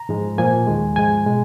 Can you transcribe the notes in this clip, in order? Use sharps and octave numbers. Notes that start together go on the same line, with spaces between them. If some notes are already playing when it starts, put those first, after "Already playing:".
Already playing: A#5
G#2 F3 G#3
A#2 F3 A#3 G#5
D#2 D#3 G#3
G#2 F3 G#3 G#5
B2 G#3